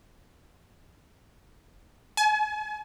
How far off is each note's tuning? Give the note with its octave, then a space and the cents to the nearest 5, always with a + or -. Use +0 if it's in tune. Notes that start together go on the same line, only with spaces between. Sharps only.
G#5 +40